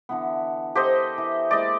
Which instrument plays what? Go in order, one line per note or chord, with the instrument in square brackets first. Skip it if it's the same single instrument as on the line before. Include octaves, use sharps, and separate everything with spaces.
[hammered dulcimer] D3 E3 B3
[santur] G4 C5 D#5 [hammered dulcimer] A4 A#4 C#6
[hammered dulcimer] E3
[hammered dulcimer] G#3 A#3 E4 [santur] D5 D#5